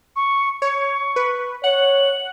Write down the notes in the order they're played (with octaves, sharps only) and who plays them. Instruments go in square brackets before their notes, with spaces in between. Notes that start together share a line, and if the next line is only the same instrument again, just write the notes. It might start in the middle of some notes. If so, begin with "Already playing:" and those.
[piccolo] C#6
[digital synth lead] C#5 [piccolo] C#6
[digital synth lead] B4
[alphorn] C#5 [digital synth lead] F#5 [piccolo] F#7